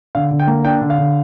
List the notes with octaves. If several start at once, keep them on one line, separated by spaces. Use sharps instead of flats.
D3 F5
D3
G5
A#3
D4 G5
D3
F5
D3